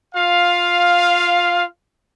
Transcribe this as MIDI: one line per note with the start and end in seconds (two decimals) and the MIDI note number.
0.15 1.66 65
0.15 1.66 77